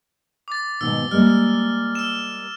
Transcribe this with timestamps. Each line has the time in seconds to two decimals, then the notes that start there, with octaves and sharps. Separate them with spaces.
0.48 D6 A6
0.81 G#2 B2 D#3 E6
1.11 G3 G#3 A#3 F6
1.95 E6 E7